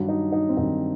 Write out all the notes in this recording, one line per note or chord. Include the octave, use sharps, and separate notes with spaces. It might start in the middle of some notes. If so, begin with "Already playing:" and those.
Already playing: G2 D#3 F#3
D#4
D#4
C4
G2 D#3 F#3 D#4